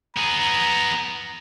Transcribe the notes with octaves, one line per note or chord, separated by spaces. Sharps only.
B3 G#4 A#5